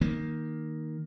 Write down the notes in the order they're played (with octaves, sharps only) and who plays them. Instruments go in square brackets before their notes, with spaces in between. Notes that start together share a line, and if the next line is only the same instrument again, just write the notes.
[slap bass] D#3 A#3